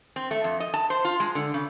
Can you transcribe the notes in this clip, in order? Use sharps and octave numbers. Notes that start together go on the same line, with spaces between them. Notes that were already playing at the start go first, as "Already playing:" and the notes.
C4
A3
F2
D#5
A5
C5
F4
G#3
D3
C#3